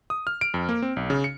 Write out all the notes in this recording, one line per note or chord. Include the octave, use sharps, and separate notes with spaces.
D#6
F6
D7
F2
A#3
C4
B1
C#3
C#7